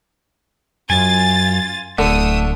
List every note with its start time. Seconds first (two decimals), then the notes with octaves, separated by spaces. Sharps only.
0.90 F#2 F4 G#5 A6
1.99 D1 D3 A3 D#6 E6